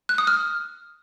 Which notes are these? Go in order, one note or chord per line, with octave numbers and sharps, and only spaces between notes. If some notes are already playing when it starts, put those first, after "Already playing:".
F#6
D#6
F6